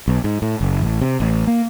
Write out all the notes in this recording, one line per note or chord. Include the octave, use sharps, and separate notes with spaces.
B1
G#2
A2
F#1
A1
C3
A1
A#3